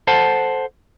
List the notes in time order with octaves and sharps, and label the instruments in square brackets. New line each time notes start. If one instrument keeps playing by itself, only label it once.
[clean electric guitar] A4 C5 F#5 A5